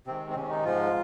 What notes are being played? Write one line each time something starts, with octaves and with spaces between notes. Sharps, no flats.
C3 D#3 G#3 C4
C4
C3 D#3 G#3 C#4
D#4
G#2 F3 G#3 F4